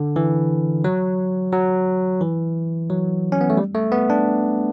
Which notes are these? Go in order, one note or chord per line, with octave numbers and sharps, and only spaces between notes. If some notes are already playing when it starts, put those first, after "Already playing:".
Already playing: D3
E3
F#3
F#3
E3
F#3
C#4
B3
A3
G3
A3
B3
D4